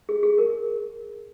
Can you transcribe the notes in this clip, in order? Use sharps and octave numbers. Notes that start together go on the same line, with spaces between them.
G#4
G#4
A#4